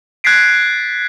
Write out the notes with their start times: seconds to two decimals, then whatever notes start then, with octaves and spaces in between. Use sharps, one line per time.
0.24 F#6 G#6 A6 B6 C7 D7